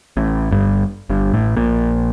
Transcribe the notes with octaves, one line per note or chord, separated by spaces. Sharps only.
A1 A2
G1 G2
G1 G2
A1 A2
A#1 A#2